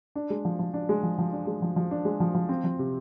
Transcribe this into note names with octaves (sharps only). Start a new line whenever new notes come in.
D4
G#3
F3
F3
D4
G#3
F3
F3
D4
G#3
F3
F3
D4
G#3
F3
F3
C4
F3
C3